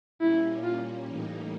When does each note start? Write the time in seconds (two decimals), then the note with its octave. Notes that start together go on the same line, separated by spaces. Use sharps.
0.20 A#2 G3 A#3 C#4 E4
0.63 F4
1.05 A2 E3 G3 A#3 D#4